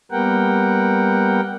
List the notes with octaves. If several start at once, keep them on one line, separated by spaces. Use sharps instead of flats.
G3 A#3 B3 A#4 F#5 G5